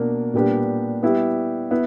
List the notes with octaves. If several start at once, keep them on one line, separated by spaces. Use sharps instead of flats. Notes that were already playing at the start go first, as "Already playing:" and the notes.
Already playing: B2 A#3 D4 A#4
A#2 G3 B3 D4 G4
G3 B3 E4 G4
B3 E4